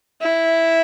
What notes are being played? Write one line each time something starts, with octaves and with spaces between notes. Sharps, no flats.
E4